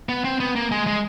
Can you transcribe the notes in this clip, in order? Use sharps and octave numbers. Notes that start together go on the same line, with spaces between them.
B3
C4
B3
A#3
G#3
G#3